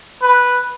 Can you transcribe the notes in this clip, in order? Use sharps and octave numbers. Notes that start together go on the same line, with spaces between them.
B4